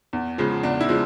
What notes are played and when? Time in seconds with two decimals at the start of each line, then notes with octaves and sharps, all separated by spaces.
0.13 E2
0.38 C#3 F3 G#3
0.63 E2 D4
0.81 E4
0.89 C#3 F3 G#3